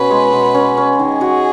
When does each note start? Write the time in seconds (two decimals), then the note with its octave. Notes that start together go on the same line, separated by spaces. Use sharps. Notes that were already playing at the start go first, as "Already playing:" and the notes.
Already playing: B2 C#4 B4
0.11 G#3
0.33 B2
0.55 C#4
0.77 C#4
0.98 D#3 G#4
1.21 F#4